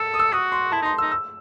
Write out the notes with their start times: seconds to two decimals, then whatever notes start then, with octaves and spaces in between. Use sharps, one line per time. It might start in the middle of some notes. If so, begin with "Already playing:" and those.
Already playing: A4 E6
0.14 D#6
0.19 E6
0.33 F#4 D#6
0.52 C6
0.72 E4 A5
0.82 D#4 C6
0.98 D#4 E6
1.12 E6